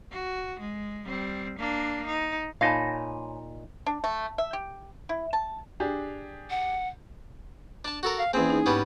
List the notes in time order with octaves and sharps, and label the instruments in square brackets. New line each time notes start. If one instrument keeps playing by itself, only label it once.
[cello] F#4
G#3
G3 C4
A#3 D4
D#4
[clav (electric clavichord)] A#2 D#4 [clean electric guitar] C#5 G#5 B5 [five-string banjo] F5 A5
[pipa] D4
A3
E5
G4
E4
A5
[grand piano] D4 G4 G#4
[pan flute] F#5
[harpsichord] D4 A5
F#4 A4 A#4
[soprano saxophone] F5
[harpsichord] E2 C4 [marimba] A#3 C#4 E4 [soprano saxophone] G#4
[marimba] D#4
[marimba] G#2 [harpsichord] G3 B3 C#4